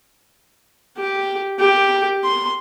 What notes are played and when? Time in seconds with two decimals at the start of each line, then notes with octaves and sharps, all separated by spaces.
0.97 G4
1.60 G4
2.24 C6